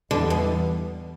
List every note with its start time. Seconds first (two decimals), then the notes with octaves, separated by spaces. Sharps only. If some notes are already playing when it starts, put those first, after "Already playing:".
0.11 E2 D3 E3 G3 B3
0.30 B2